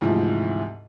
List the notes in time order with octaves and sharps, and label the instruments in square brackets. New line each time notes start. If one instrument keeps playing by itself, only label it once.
[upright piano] D2 G#2 C3 E3 F3